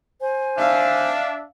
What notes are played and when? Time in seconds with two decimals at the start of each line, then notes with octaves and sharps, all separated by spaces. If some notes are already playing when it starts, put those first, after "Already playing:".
0.23 C5 G#5
0.58 D4 E5 F5